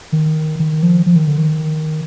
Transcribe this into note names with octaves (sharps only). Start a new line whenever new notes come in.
D#3
D#3
F3
F3
D#3
D3
D#3